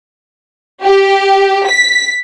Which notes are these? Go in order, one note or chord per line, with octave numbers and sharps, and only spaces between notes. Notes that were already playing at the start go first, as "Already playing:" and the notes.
G4
B6